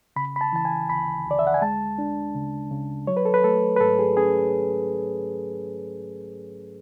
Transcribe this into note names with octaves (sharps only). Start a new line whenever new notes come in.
C#3 B5
B5
A5
E3 A5
G#5
D2 B5
D2
D5
E5
F#5
G#5
G#3 A5
D4
C#3
C#3
F#3 C#5
B4
A4
B4
A3 A4
B4
G#2 A4
G#4
C#4 G#4